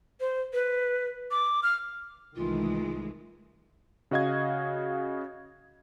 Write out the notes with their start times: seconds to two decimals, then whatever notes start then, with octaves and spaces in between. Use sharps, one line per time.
0.20 C5
0.53 B4
1.31 D6
1.63 F6
2.36 C2 D#3 E3 G#3 A3 F4
4.11 C#3 F#4 D#5 F5 G#6